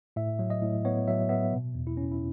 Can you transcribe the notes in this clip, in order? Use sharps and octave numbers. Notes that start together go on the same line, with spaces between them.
A2 E5
F#3
D#5
A2
B3 C#5
F#3 E5
B3 E5
B2
E2
E4
C#4
E4